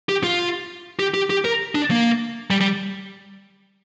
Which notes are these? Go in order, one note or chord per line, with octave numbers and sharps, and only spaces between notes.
G4
F4
G4
G4
G4
A#4
D4
A#3
G3
G3